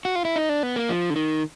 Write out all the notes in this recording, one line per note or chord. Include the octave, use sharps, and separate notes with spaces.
F#4
F4
E4
D#4
D4
B3
A#3
F3
D3
D#3